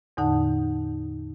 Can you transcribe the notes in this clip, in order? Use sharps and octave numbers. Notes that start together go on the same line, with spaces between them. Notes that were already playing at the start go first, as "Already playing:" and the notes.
E2 A2 D3 D#4 F#5 A5